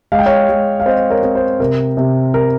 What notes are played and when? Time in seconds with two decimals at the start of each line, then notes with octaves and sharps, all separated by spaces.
0.12 G#3 F5
0.19 G5
0.26 C#5 F5
0.49 G#3
0.80 F5
0.86 C4 C5 D#5
1.10 A#4 C#5
1.23 C4
1.35 C5
1.60 C3 A#4
1.97 C3
2.34 A#4